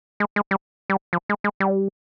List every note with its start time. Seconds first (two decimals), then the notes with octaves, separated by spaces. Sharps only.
0.20 G#3
0.36 G#3
0.51 G3
0.90 G3
1.13 F3
1.29 G#3
1.44 G#3
1.60 G3